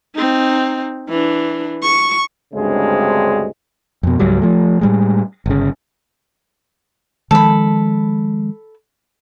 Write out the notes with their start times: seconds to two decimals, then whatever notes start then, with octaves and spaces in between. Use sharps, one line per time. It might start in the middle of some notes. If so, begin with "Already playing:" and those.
0.16 C4 D#4
1.09 E3 D4
1.83 C#6
2.54 D2 G2 C#3 G#3 C4 G#4
4.03 F2 B2
4.19 C#2 G#2 F#3 G3
4.42 F3 A3
4.81 A2 G3 G#3
5.46 G1 C#3
7.31 D#3 F3 G#3 A4 B5